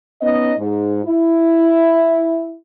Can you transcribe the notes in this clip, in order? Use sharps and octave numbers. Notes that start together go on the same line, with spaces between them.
B3 C#4 D#4 D#5
G#2
E4